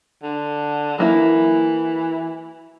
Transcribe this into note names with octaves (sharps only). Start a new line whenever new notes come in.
D3
E3 F#3 A#3 E4